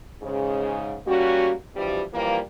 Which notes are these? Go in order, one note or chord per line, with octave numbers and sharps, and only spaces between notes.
G#2 C#3
G3 A#3 C#4 F#4
G2 B2 E3 F3 G3
E3 F3 G3 A#3